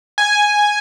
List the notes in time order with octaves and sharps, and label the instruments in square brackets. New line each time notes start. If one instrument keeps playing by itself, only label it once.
[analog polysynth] G#5